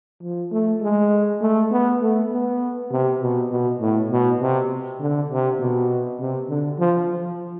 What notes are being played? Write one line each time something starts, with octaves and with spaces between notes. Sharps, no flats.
F3
A3
G#3
A3
B3
A3
B3
C3
B2
B2
A2
B2
C3
D3
C3
B2
C3
D3
F3
F3